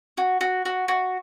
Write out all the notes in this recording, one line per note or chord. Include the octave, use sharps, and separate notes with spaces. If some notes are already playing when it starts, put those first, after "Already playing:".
F#4
F#4
F#4
F#4